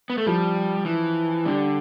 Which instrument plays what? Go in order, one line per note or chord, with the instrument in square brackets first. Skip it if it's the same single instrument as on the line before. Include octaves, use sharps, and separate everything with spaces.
[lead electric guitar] B3
A3
[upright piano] F3 [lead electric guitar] G3
[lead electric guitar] E3
[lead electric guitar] D3 [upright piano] G3